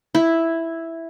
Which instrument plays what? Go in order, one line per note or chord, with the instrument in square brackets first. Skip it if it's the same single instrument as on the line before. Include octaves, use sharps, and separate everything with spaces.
[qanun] E4